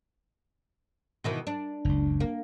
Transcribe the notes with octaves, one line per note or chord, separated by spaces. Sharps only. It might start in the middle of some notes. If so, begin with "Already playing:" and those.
B2 D#3 E3
D4
F#1 C#2
A#3